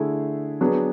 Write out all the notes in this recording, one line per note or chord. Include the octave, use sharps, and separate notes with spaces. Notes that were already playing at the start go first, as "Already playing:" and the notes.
Already playing: D3 A3 E4 G#4
F#3 B3 D4 G#4